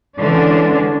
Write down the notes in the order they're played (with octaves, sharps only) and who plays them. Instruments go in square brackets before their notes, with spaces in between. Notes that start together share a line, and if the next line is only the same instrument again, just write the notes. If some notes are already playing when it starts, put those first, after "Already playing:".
[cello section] D3 E3 G#3 C#4 D4